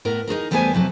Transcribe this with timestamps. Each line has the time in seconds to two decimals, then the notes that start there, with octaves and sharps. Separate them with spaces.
0.05 A2 B3 A#4
0.27 D#4 F#4 G#4 A#4
0.51 E2 G3 A3 B3 C5 G#5
0.74 F2 C3 F#3 A4